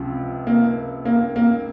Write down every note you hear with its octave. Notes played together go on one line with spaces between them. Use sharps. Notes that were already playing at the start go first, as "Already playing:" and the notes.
Already playing: C#2 C3 F3
A#3
A#3
A#3